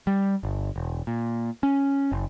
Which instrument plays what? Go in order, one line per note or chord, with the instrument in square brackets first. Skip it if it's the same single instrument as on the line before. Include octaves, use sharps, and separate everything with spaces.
[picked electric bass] G3
G1
E1
A#2
C#4
F#1